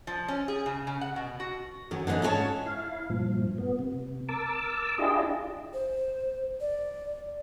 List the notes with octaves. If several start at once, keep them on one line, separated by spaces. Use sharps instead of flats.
F3
C#4
G#4
C#3
C#3
F#5
B2
F#4
F#2 D#3 C#4
D3 E3 B3 C#4 D#4
G#2 C#4 G4 B4 C#5 A5
E4 F5
G2 A#2 F3
B3
C3
A#4 A5 D6 E6
D4 E4 F4 G4 G#4 D#5
C5
D5